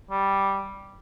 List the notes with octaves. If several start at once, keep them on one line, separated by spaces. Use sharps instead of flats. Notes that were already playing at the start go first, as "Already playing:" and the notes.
G3